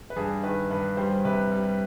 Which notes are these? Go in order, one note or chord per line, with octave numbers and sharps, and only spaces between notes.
B4
G2 G#4
D#3 B4
G2 B4
G3 C5
C3 B4
G3